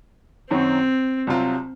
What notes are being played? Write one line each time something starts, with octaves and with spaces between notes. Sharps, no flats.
F#2 D#3 F#3 C4 C#4 F#4
C2 C3 F#3 C4 F4